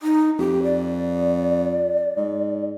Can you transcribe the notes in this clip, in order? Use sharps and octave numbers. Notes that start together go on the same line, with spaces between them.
D#4
F2 G4
D5
G#2